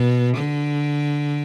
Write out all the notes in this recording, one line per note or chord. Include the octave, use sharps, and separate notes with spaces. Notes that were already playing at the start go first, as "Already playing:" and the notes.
Already playing: B2
D3